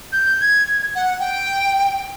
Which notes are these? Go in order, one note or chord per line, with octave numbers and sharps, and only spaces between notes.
G6
G#6
F#5
G5